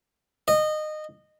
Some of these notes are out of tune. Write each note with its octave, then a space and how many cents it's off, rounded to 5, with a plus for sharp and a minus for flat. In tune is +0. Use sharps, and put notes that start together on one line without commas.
D#5 -20